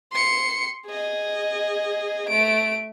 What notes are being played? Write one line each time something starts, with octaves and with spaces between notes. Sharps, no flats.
C6 C#7
G#4 D#5
A3 D7